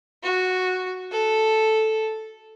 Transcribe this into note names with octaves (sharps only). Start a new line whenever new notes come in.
F#4
A4